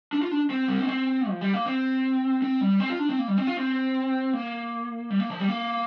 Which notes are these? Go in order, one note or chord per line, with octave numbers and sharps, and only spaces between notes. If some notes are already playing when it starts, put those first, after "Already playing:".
D4
F4
D4
C4
G3
A#3
C4
F3
G3
A#3
C4
C4
G3
C4
F4
D4
C4
A#3
G3
C4
F4
C4
A#3
G3
A#3
F3
G3
A#3